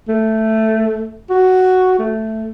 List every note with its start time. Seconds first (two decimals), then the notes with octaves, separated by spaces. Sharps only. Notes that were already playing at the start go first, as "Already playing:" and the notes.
0.08 A3
1.30 F#4
1.99 A3